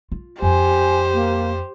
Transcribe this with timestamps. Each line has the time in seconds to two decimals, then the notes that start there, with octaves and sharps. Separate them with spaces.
0.12 F4
0.42 F2 G4 C5 G#5
1.13 A#3